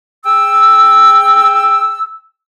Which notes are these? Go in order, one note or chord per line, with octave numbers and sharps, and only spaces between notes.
G#4 G5 E6